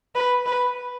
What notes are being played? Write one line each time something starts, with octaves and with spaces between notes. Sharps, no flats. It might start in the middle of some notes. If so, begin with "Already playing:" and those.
B4
B4